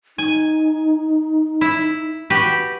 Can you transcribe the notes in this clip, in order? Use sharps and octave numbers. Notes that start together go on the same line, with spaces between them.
D#4 G#5
E4
F#4 G4 B4